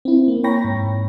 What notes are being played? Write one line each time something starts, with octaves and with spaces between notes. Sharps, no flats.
C4 E4
A#3
C#5 G5 A#5 B5 C#6 A#6
G#2